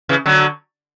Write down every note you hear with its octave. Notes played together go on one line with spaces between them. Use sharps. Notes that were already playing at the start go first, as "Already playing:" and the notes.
C#3 E3
D3 F#3